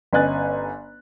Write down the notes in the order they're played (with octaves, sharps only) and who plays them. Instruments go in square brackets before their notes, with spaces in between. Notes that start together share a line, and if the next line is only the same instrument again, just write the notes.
[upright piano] G1 C#4 D#5 G#5 F#6 A6